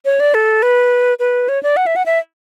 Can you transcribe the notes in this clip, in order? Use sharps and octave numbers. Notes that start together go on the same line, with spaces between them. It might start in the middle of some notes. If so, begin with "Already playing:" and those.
C#5
D5
A4
B4
B4
C#5
D5
F#5
E5
F#5
E5